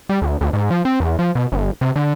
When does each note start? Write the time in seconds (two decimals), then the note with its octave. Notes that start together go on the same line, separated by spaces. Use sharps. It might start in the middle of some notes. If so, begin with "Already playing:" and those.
0.09 G3
0.22 D2
0.41 D2
0.53 G#2
0.71 F3
0.85 C4
1.00 E2
1.19 F3
1.35 B2
1.52 G1
1.81 C3
1.96 D3